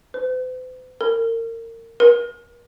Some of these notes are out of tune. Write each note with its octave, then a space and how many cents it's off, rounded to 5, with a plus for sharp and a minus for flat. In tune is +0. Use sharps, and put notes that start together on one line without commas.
C5 -45
A#4 -30
A#4 +40